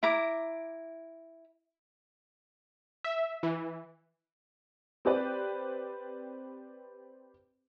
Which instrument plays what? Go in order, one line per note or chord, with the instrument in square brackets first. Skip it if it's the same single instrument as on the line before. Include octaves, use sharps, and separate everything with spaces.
[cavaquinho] E4 A#5 D6
[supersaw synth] E5
E3
[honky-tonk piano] C4 G4 B4 D5